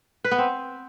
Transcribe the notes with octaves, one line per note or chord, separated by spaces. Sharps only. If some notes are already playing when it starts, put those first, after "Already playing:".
B4
B3
C4